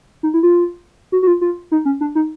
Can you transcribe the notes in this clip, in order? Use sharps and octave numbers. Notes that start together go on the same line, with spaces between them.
D#4
E4
F4
F#4
F#4
F4
F4
D#4
C#4
D4
D#4